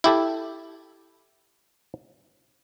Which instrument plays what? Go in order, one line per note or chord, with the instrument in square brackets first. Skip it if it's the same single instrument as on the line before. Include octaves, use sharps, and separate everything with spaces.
[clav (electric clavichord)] E4 G4 A4